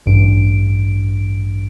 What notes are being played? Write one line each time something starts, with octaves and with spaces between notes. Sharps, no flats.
A1 G2 D7